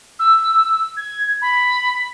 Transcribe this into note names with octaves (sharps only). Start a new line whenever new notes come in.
E6
G#6
B5